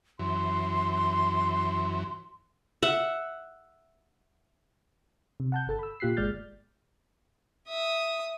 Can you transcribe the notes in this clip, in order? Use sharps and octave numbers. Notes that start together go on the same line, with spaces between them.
F#2 E3 C6
E5 F#5
C3
F#5 A5 G6
G1 A4 A5
B5 E6
A#2 F4 G4 F#6 B6 C7
G1 G#3 D5 F6 G6 A6
E5 D#6